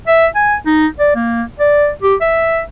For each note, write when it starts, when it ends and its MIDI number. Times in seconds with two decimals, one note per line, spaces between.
0.07 0.27 76
0.35 0.55 80
0.66 0.87 63
1.00 1.14 74
1.15 1.43 58
1.60 1.90 74
2.03 2.15 67
2.21 2.61 76